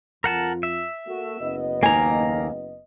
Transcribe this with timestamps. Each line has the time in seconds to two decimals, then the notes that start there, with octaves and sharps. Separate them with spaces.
0.24 F2 F4 A#4 F#5 A5
0.63 E5
1.07 A#3 F#4 A4
1.40 F#1 B3 D#5
1.83 D#2 A#3 G#5 A#5